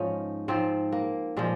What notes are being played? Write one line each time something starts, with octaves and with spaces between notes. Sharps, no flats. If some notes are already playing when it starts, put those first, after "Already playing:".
Already playing: G#2 F3 C#4 D#4 F4
G#2 F3 C4
A#3
A#2 F3 G#3